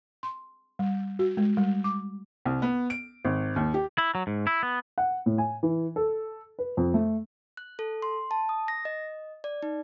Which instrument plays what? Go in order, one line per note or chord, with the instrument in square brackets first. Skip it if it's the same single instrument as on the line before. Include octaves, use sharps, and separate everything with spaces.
[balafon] C6
G3
F#4
G#3
G3
D6
[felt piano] C2
B3
D7
G#1
D#2
G4
[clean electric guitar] E4
F#3
G#2
E4
B3
[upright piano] F#5
A2
G#5
E3
A4
B4
F2
A3
[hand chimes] F#6
A4
C6
A5
D#6
A#6
D#5
D5
D#4